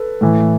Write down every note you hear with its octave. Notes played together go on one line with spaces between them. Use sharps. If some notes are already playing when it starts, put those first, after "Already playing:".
Already playing: A4 B4
A2 E3